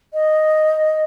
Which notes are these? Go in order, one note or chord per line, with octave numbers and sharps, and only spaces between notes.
D#5